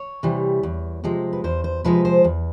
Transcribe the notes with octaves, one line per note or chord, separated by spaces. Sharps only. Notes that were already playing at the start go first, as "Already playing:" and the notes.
Already playing: C#5
C3 E3 G3
E2
C3 F3 G#3
B4
E2 C5
C5
C3 F3 G#3 B4
C5
E2